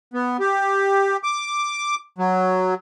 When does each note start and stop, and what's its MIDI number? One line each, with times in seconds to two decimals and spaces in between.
0.14 0.37 59
0.40 1.17 67
1.23 1.95 86
2.18 2.74 54